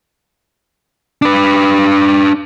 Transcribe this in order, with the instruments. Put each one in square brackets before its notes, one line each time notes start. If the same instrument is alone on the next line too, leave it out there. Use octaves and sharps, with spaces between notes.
[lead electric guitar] D4 B4